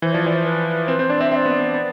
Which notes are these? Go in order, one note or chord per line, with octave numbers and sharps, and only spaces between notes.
E3 C5
F3 D5
E3 D5
C5
B4
C4 B4
C4 C5
D4 D5
C4 E5
C4 D5 E5
B3
B3
B3